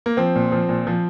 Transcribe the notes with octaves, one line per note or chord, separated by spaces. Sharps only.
A#3
F3 C4
A#2
F3
A#2
F3